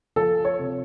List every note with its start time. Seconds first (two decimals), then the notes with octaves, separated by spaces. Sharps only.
0.16 F3 A4
0.45 C#5
0.59 C3